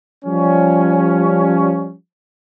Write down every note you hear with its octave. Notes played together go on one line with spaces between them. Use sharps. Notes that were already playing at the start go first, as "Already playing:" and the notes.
F3 G3 C#4